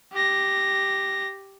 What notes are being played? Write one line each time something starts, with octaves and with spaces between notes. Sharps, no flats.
G4 A#6